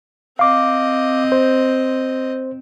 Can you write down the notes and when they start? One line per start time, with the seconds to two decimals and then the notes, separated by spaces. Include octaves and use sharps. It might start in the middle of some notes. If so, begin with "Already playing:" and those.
0.39 C4 D#5 F5 D6
1.32 C5